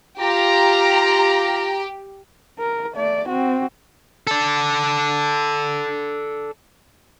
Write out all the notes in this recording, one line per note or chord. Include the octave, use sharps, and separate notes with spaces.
F4 G4 A#5
A#4
A3 D5
C4 F#4
A4 D5